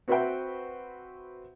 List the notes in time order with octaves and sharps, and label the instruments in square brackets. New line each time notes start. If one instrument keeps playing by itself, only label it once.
[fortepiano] C4 F#4 B4 C5 E5 G5